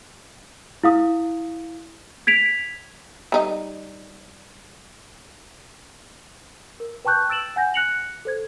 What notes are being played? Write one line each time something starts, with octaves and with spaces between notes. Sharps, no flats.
E4 F5 D#6
G#6 B6 D7 F7
G3 D#4 D#5
A#4
B4 G5 A5 C#6 F#6 G6
E6 A6 D7 E7 F#7
F#5 G#5 G6 A#6
F#6 A#6 C#7 F7 F#7
A4 C5 G#6